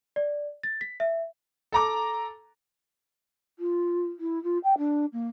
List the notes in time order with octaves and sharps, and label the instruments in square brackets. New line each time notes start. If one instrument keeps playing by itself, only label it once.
[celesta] D5
A6
B6
E5
[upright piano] A4 A#5 D6
[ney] F4
E4
F4
G5
D4
A#3